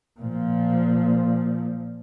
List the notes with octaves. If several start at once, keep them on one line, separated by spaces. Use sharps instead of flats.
A#2 F3